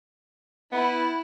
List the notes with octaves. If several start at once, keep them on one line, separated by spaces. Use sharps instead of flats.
B3 E4